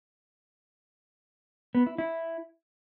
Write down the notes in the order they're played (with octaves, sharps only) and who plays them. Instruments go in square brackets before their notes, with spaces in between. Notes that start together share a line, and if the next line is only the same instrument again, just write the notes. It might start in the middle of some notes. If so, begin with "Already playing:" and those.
[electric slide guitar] B3
E4
E4